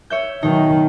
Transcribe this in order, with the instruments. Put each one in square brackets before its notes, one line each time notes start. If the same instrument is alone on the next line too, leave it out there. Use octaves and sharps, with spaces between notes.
[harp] C#5 E5 G6
[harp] B2 D#4 [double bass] D#3 F#3